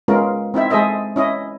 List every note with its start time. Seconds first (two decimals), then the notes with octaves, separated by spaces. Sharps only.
0.08 G#3 B3 C#4 F4 A#4
0.54 C4 D#4 E4 E5
0.70 G#3 G#4 A4 C5 D#5 E5
1.16 C#4 E4 D#5